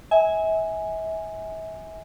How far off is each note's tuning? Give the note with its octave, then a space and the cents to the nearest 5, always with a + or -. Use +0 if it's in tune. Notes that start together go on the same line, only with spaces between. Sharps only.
E5 -35 G#5 +0